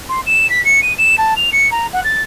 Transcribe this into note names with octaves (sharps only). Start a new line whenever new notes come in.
C6
E7
B6
C#7
D#7
E7
A5
F7
C#7
A#5
F#5
A6